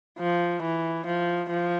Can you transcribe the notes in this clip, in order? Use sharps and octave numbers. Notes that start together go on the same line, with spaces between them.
F3
E3
F3
F3